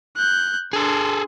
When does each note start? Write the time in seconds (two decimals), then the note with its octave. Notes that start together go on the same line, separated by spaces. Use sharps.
0.17 F#6 G6
0.73 D4 G#4 A4 C6